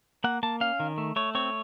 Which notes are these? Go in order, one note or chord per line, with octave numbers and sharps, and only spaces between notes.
A#3 F#5
A#3 A5
C#4 F5
D#3
A3
A3 C#5
C4 C#5